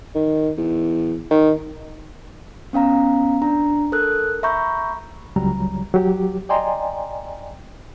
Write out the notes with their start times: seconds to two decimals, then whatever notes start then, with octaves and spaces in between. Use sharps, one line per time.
0.15 D#3
0.58 E2
1.31 D#3
2.73 B3 C#4 F5 A#5
3.42 D4 A#5
3.92 A4 A#4 F#6
4.43 E5 A#5 B5 C#6 G6
5.36 C#2 F#3 G3 A#5
5.94 F#3 F#4 G4
6.49 D5 D#5 G5 G#5 A#5 C6